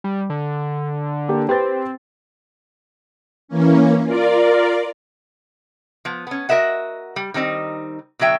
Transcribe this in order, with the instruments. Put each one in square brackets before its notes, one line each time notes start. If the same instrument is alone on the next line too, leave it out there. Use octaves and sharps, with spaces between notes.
[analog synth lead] G3
D3
[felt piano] A#3 G4
[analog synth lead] C4 [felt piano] G4 B4 A6
[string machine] E3 A#3 C#4
F4 A#4 D5
[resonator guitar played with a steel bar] F3 B3
B3 C#4
F#4 A#4 D#5 E5 F#5
G3
D#3 G3 C4 D#4
B2 D3 F#3 E5 G5